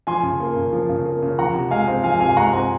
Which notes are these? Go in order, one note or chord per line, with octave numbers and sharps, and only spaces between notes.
F3 G#5 C6
C#3
A#3
C#3
F3
C#3
A#3
C#3
F3 F#5 A#5
C3
G#3 F5 G#5
C4
F3 F5 G#5
C3 F5 G#5
G#3 F#5 A#5
C4 G#5 C6